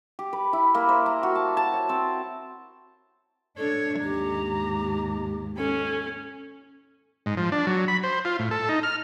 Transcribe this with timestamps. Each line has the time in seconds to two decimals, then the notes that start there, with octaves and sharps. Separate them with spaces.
0.19 G4
0.33 B4
0.53 E4
0.75 A#3
0.89 C5
1.06 A#5
1.23 F#4
1.35 A5
1.57 A5
1.74 C#5
1.89 C4
3.57 D4 A4 C#5
4.03 D#2 G#2 G4 A#5
5.58 C#4 A4
7.26 G#2
7.37 F3
7.52 D4
7.67 F#3
7.88 B5
8.03 C5
8.25 F4
8.39 A2
8.51 A4
8.69 D#4
8.83 F6